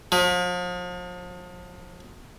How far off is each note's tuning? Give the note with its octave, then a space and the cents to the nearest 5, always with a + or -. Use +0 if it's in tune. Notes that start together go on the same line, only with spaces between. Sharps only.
F3 +40